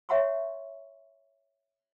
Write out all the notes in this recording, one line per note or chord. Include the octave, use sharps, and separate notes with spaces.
C#5 E5 F#5 A#5 C6 C#6